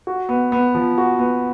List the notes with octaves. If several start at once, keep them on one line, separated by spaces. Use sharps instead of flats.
F#4
B3
B3
F3
F#4
B3